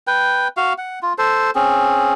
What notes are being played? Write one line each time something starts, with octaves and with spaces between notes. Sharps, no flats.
B4 G5
F#4 F5
F#5
F4
A4 C5
C4 C#4 G#4